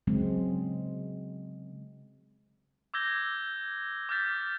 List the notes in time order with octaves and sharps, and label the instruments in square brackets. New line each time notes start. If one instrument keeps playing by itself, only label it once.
[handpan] C#3 F#3 G#3 C4
[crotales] D6 E6 G6 G#6 A#6 G7
D6 F6 G6 A6 B6